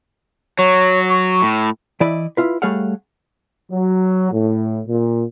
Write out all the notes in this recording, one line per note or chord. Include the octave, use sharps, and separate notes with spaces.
F#3 C#5
C#6
A2
E3 E4 D5 D#5 B5
E4 F4 B4
G3 A3 G#4 C#5 F5 F#5
F#3
A2
A#2